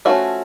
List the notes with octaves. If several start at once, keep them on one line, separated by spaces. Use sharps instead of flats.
F3 A3 C#4 E4 F#4